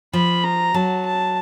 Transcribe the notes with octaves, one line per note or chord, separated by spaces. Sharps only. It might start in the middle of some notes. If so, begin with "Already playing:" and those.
F3 B5
A#5
F#3 A5
A5